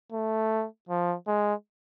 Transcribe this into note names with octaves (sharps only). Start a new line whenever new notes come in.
A3
F3
G#3